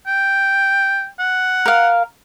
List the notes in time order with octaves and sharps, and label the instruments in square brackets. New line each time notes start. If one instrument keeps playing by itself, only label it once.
[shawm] G5
F#5
[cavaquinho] A#4 F5